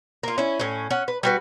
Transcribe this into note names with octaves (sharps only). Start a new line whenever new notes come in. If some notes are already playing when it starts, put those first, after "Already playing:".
A#3 F4
C#4 E4
A2 C#4
C#4 F#5
B4
G3 F#4 B4